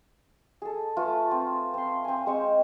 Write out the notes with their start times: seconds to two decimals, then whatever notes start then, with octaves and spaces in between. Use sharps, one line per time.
0.62 G#4 A4
0.96 A3 F4 A4 B4
1.31 C4
1.74 C4 C6
2.05 C4 G#5
2.27 G#3 C4 C5 C#6